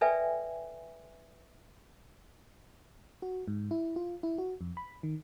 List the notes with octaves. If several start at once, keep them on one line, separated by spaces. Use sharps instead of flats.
A4 B4 D5 E5 G5 G#5
F#4
G#2
E4
F4
E4
F#4
F2
B5
D#3